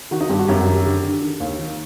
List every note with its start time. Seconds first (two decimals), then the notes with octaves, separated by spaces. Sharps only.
0.11 D#3 F#4
0.21 D#4
0.29 G2 G4
0.39 F#4
0.48 F#2 G4
0.60 F#4
0.66 D#3
0.72 G4
0.85 D3 G4
1.03 D3
1.21 D#3
1.40 D#2
1.59 D#3